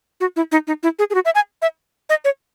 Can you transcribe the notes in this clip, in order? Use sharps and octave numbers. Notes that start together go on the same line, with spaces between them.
F#4
E4
D#4
D#4
E4
G#4
G#4
F#4
E5
G#5
E5
D#5
C#5